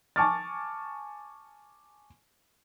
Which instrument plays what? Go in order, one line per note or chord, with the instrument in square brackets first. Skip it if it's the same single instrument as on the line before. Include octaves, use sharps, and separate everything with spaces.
[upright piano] G#5 A5 C#6 D6 F6 A6